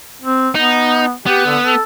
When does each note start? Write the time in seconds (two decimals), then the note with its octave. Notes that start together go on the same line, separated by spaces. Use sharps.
0.22 C4
0.55 B3 D#4
1.26 B3 G4
1.46 D3
1.63 A4